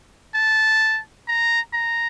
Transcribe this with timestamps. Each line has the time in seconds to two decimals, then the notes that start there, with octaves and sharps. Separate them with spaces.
0.35 A5
1.28 A#5
1.73 A#5